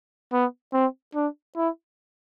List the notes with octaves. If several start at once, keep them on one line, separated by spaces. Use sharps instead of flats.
B3
C4
D4
E4